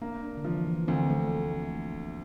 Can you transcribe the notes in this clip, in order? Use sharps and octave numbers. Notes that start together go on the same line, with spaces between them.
A#3 D4
D4
D3
E3 F3
E3
D2 C4
A3